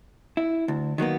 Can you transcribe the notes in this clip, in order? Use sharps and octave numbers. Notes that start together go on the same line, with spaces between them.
E4
D2
D#3 F#3 A#3 B3